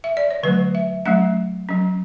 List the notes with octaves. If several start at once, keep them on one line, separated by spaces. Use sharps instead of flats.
E5
D5
C#5
D3 F#3 A3 B4
E5
F#3 A3 C#4 E5
F#3 C#4